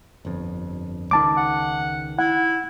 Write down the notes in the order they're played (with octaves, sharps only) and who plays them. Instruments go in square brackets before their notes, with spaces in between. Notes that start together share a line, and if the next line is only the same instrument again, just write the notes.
[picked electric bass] G1 F2
[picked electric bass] C#2 D#3 [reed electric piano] A5 D6
[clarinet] F#5
[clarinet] E4 [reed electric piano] F#5